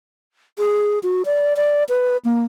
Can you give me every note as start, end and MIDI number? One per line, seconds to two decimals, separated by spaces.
0.58 0.99 68
1.03 1.22 66
1.25 1.56 74
1.56 1.84 74
1.89 2.17 71
2.25 2.45 58